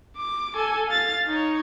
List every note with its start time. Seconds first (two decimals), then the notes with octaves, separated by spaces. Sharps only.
0.17 D6
0.55 A4 G#5
0.88 F5 A6
1.26 D#4 C#5